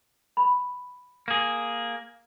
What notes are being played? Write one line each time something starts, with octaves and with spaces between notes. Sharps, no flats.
B5
A#3 G#4